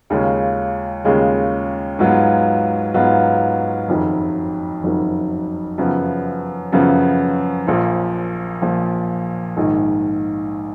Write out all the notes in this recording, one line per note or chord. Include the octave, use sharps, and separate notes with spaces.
D#2 C#3 G#3 C#4 F4
D#2 C#3 G#3 C#4 F4
G#2 F#3 B3 F4
G#2 F#3 B3 F4
F#1 F2 D#3 F#3
F#1 F2 D#3 F#3
F#2 C#3 F3 B3
F#2 C#3 F3 B3
A#1 A#2 F3
A#1 A#2 F3
A#1 G#2 D#3